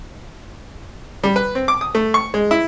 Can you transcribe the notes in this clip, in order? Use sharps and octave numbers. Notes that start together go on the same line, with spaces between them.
G3
B4
C4
D6
D#6
A3
C#6
G#3
E4